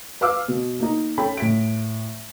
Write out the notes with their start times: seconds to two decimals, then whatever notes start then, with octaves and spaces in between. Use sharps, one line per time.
0.21 B4 F5 D6 E6
0.48 B2
0.80 A#3 D#4
1.18 C#4 A4 G5 B5
1.37 A2 B6 D7